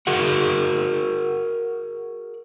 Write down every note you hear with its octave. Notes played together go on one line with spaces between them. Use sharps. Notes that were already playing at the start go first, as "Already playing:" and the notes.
F#4 G#4 A#4 F#5